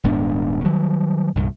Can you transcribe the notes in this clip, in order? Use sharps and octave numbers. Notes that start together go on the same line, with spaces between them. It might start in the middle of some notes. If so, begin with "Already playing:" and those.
D#1 G#2 B3 D4
D#3 F#3 G3
C2 G2 A#2